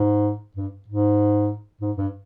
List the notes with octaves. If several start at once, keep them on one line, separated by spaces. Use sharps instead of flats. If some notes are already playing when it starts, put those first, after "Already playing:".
Already playing: G#2
G2
G#2
G#2
G2